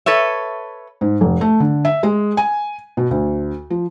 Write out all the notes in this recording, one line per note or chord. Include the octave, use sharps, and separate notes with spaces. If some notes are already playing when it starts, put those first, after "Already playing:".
A4 B4 C#5 E5
G#2
F1
A3
D3
E5
G#3
G#5
B2
D2
F3